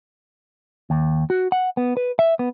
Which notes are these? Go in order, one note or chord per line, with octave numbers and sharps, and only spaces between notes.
D#2
F#4
F#5
B3
B4
E5
B3